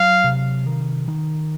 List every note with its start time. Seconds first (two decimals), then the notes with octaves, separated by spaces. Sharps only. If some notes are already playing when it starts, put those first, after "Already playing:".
Already playing: F#3 F5
0.24 C3
0.66 D#3
1.08 D#3